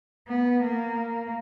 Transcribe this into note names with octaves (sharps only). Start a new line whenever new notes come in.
B3
A#3